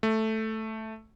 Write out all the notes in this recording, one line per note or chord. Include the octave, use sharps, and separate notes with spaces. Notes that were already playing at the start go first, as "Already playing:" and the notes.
A3